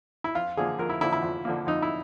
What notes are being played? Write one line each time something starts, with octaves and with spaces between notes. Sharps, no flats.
E4
F2 F4
D3 F3 A#3 G#4
F2 A#4
E4
D3 F3 A#3 E4
E4
F2
D3 F3 A#3
F2 D#4
E4